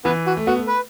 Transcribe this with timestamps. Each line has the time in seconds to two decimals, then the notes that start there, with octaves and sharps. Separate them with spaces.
0.04 E3 B3
0.27 F#4
0.37 A3
0.47 B3 F#4
0.57 A3
0.68 B4